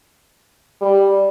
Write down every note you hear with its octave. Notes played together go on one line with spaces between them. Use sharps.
G3